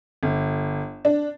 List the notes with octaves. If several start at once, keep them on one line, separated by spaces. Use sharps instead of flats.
G1
D4